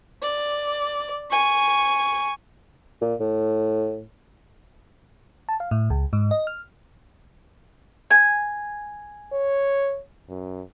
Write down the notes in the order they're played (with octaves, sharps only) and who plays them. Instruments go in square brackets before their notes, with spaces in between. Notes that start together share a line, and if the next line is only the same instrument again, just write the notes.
[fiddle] D5
G#5 C#6
[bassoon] A#2
A2
[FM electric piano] A5
F5
A2
C#2
G#2
D#5
F6
[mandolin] G#5
[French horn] C#5
F#2